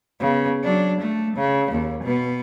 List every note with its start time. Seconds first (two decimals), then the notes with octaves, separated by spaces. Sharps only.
0.20 C#3 B3
0.63 F#3 D4
1.00 A3
1.36 C#3
1.71 D#2
2.03 B2 B3